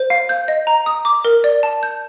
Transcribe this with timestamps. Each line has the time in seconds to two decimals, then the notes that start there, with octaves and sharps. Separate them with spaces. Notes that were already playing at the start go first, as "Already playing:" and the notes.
Already playing: C5
0.10 F5
0.29 G6
0.48 D#5
0.67 A#5
0.86 D#6
1.05 D6
1.25 A#4
1.44 D5
1.63 A5
1.83 G6